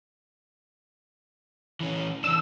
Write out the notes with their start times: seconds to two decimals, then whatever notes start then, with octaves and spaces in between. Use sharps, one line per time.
1.81 E3 C#4
2.24 E3 D4 E6